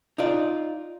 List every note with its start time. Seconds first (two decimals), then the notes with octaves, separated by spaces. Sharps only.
0.18 D#4 F4 D5